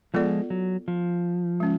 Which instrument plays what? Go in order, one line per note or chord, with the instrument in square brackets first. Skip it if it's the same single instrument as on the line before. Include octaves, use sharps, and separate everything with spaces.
[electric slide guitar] F3 G#3 [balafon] B3 F4 A4 D5
[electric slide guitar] F#3
F3
[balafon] G#3 C#4